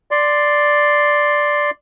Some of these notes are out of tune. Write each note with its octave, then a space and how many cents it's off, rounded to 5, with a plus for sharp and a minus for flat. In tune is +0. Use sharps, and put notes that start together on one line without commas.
D5 +0 C6 +0